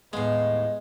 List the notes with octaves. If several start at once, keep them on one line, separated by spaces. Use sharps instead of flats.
D#2 A2 G#3 B3 D#5